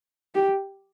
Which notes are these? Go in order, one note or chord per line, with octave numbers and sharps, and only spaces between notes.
G4